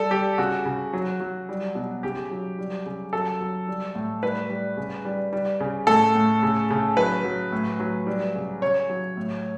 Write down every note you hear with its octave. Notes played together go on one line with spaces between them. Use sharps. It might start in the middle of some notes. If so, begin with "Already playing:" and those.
Already playing: G3 A4
G3 G4
C#3 F#4
C#3
F#3
F#3
G3
B2
C#3 G4
F#3
G3
C#3
F#3 A4
F#3
G3
A2
G3 B4
G3
C#3
G3
G3
C#3
A2 A4
A2
C#3
C#3
F#3 B4
F#3
A2
F#3
G3
C#3
C#3 C#5
F#3
A2